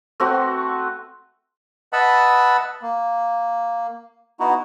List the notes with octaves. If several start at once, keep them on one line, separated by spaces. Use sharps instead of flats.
A3 C4 F#4 B4
B4 D#5 E5 F#5 A5 B5
A#3
B3 D#4 E4 F#4